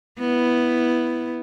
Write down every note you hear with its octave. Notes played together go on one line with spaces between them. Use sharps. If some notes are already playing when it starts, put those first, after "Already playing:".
B3 E4